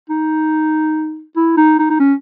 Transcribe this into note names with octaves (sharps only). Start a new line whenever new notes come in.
D#4
E4
D#4
D#4
D#4
C#4